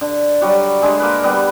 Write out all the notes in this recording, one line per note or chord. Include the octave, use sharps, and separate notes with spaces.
D3
F#3 G3 F#4
D3 G#3 G#4
A#3 A#4 B4
G3 B3 B4